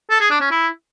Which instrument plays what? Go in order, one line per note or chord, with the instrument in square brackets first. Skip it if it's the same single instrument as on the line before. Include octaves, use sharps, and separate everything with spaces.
[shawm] A4
G#4
D4
C#4
E4